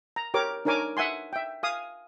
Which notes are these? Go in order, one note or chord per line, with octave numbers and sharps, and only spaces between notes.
A#5
G4 A#4 C#5 D6
D4 D#4 A#4 C#5 G#5 D6
E5 F#5 G#5 C6
E5 G5
F5 G#5 D#6